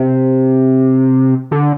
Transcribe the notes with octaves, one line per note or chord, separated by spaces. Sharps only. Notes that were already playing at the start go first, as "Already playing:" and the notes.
Already playing: C3
D3